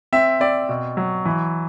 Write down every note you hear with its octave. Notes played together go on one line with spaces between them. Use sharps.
C4 E5
C4 D5
B2
F#3
E3